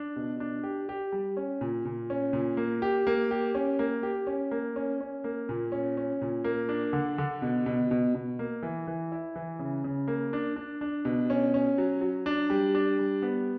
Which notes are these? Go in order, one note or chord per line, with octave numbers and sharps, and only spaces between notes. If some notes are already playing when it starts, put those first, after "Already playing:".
Already playing: D4
B2
D4
G4
G4
G3
C#4
A#2
A#2
C#4
A#2
A#3
G4
A#3
G4
C#4
A#3
G4
C#4
A#3
C#4
C#4
A#3
A#2
C#4
C#4
A#2
A#3
D4
D3
D3
B2
B2
B2
B2
A#3
E3
E3
E4
E3
C#3
C#3
A#3
D4
D4
D4
B2
C#4
C#4
F#3
F#3
D4
G3
D4
G3
B3